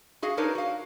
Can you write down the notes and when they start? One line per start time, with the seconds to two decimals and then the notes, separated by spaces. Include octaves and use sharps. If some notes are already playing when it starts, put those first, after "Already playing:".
0.22 F#4 G#4 D#5 F5
0.37 D4 D#4 A#4 B4 C#5
0.55 F#4 F5